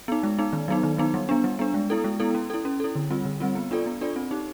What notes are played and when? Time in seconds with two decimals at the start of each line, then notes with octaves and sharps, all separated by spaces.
0.08 B3 D#4
0.23 G#3
0.39 B3 D#4
0.53 D#3
0.68 F#3 B3 D#4
0.83 D#3
0.98 F#3 B3 D#4
1.14 G3
1.29 B3 D4
1.44 G3
1.59 B3 D4
1.74 G#3
1.90 B3 E4 A4
2.04 G#3
2.20 B3 E4 A4
2.35 C#4
2.50 E4 A4
2.65 C#4
2.80 E4 A4
2.95 D3
3.10 G3 C4 F4
3.25 D3
3.40 G3 C4 F4
3.55 B3
3.71 D4 F4 A4 D5
3.86 B3
4.01 D4 F4 A4 D5
4.16 C4
4.31 D#4 G4